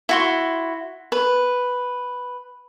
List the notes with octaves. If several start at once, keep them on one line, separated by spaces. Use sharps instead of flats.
E4 F#4 C6
B4